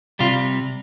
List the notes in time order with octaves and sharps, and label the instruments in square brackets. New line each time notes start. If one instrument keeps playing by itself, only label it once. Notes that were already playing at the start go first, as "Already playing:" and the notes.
[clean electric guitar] C3 G3 F4